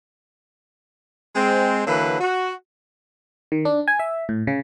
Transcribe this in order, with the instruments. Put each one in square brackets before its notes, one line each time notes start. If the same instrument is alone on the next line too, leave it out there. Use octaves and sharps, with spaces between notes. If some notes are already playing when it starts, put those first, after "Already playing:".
[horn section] G#3 C4
D3 E3 F#3 A#3 B4
F#4
[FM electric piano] D#3
D4
G#5
E5
A2
C#3